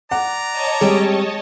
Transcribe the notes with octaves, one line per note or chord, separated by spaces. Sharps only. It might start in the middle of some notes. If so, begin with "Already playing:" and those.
D5 F#5 A#5
C#5 D#5 A5
G3 G#3 C4 G5